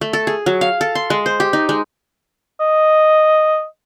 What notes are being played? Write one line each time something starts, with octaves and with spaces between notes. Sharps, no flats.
A3
A4
G#4
F#3
F5
A4
C6
G#3
C5
G4
D#4
G#3
D#5